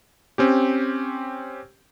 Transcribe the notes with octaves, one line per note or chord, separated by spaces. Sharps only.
C4 C#4 G4